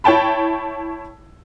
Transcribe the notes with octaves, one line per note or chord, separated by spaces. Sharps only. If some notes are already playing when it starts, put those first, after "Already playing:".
E4 C#5 G5 A5 B5